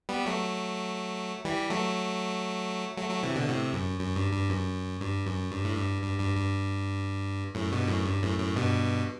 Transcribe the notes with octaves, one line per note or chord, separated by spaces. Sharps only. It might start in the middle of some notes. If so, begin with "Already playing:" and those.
G3 B3
F#3 A3
E3 G3
F#3 A3
F#3 A3
F#3 A3
C3 E3
B2 D3
A2 C3
F#2
F#2
G2
G2
F#2
G2
F#2
G2
A2
G2
G2
G2
G2
F#2 A2
G2 B2
F#2 A2
G2
F#2 A2
F#2 A2
G2 B2